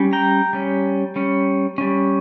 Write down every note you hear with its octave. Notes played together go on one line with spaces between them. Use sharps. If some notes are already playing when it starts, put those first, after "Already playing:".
Already playing: G3 C#4
G5 A#5
G3 C#4
G3 C#4
G3 C#4